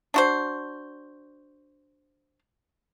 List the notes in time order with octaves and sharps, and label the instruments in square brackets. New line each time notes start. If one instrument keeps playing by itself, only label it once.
[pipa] D4 F#4 C5